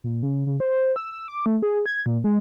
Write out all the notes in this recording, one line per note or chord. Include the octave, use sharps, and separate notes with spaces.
A#2
C#3
C#3
C5
E6
E6
D6
A3
G#4
G#6
A#2
G#3